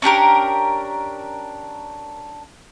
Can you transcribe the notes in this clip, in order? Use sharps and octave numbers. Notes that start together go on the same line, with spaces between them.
C#4 D4 G4 A#4